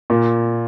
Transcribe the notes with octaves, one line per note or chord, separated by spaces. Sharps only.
A#2